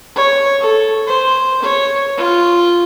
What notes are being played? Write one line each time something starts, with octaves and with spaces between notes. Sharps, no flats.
C#5
A4
C5
C#5
F4